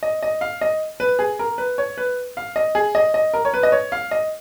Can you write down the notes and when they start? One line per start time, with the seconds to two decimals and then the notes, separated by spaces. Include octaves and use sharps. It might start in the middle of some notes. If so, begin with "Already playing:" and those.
0.03 D#5
0.23 D#5
0.41 F5
0.61 D#5
1.00 B4
1.19 G#4
1.39 A#4
1.58 B4
1.78 C#5
1.98 B4
2.37 F5
2.56 D#5
2.75 G#4
2.95 D#5
3.14 D#5
3.34 A#4
3.45 C#5
3.54 B4
3.63 D#5
3.72 C#5
3.92 F5
4.11 D#5